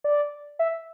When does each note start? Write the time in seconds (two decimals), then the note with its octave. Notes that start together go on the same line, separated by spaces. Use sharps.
0.04 D5
0.59 E5